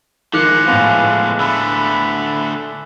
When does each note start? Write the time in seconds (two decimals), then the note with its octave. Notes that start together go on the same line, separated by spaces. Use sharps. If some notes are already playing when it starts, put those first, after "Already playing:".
0.34 D#3 F3 G#3 D6 F#6 C#7
0.68 A2 B3 F5 G#5 C6 F7
1.40 D3 A3 B5 E6